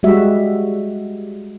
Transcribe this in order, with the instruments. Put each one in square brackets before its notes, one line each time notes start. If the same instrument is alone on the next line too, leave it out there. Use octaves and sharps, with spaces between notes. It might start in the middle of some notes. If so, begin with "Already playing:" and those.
[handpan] G3 G#3 F#4 E5